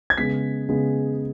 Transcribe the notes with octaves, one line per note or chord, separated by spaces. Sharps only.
G#6
C#3 G#3 B3 B6
C#3 G#3 B3